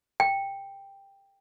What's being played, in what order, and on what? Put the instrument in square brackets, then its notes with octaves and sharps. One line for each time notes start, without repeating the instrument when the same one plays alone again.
[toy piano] G5